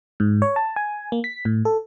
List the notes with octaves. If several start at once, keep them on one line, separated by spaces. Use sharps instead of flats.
G#2
C#5
A5
G#5
A#3
B6
A2
A4